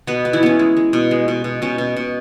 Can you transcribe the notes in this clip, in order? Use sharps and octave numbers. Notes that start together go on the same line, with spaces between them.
B2 B3 B4
B3
E3 E4
B3 C#4
G#3
G#3
B2
G#3
B2
B2
B2 C#4
B2
B2